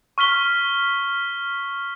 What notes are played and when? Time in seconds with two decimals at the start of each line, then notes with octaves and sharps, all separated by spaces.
0.18 C#6 F6 B6 G7